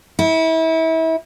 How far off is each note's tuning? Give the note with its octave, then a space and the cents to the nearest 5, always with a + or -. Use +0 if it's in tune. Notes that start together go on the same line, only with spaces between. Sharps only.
E4 -30